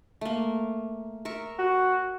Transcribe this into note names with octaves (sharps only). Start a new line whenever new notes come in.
A3 A#3
A#4 E5 C#6
F#4